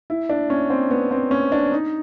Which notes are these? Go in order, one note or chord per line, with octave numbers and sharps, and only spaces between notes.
E4
D4
C#4
C4
B3
C4
C#4
D4
D#4